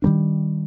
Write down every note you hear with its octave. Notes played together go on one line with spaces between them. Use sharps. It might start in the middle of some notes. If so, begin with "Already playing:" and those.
D#3 G3 A#3 D4